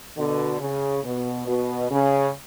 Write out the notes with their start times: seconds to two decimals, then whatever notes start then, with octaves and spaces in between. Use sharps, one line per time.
0.17 B2 D3
0.60 C#3
1.03 B2
1.46 B2
1.90 C#3